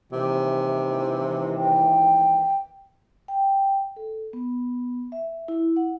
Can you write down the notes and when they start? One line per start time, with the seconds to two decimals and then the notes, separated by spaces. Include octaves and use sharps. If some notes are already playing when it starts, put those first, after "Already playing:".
0.12 D#2 G#2 C3 E3
1.56 G5
3.28 G5
3.96 A4
4.33 B3
5.12 E5
5.48 E4
5.76 F#5